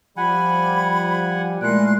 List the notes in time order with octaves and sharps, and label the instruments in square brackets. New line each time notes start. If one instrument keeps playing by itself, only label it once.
[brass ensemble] F3 G3 [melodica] F#5 G#5 [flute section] B5
[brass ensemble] A#2 E4 [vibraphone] G#3 A3 D5 [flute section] A#4 C6 F#6